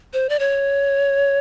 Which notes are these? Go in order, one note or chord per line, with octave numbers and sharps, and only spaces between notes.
C5
D5
C#5